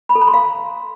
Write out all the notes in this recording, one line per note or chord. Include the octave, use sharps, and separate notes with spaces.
B5
A4
A#5
C6
F5